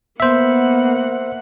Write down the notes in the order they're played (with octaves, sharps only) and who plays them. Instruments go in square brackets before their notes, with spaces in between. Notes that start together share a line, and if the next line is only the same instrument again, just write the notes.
[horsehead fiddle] A#3 F#5 [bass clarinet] B3 [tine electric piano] C5 E5